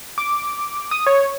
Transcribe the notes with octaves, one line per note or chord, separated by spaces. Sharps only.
D6
D#6
C#5